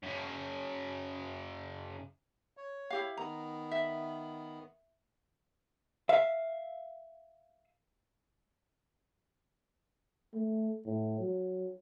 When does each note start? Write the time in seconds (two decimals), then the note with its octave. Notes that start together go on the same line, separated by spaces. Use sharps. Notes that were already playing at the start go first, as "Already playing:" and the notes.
0.03 F#2 C#3
2.57 C#5
2.90 E4 G4 F5
3.17 D#3 B3 A#5
3.72 E5
6.09 E5 F5
10.34 A3
10.86 A2
11.20 F#3